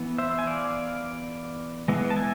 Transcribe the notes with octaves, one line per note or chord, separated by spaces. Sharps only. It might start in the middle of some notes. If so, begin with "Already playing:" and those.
Already playing: E3 B3
C5 E5
G#5
D5 F5
E3 G#3 B3
A5
E5 G#5